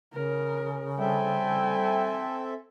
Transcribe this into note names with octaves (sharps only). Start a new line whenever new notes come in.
C#3 A#4
G3 C4 A4 E5 G5 G#5